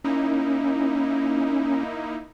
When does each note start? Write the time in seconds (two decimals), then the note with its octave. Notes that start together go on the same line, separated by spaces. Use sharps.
0.04 A#3 C#4 D#4 E4